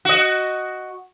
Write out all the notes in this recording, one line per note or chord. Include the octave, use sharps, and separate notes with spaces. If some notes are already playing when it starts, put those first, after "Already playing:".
F#4 D#5